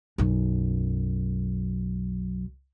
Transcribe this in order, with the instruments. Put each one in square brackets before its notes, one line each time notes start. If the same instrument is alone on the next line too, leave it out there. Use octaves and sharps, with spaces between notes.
[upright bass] B1 F#2